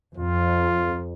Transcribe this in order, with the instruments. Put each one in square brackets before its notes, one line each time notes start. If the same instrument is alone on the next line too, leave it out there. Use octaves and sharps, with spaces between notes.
[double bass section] F2 [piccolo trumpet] F4